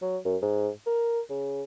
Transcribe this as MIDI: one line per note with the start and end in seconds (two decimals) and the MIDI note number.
0.02 0.17 54
0.25 0.36 42
0.42 0.69 44
0.87 1.20 70
1.30 1.62 49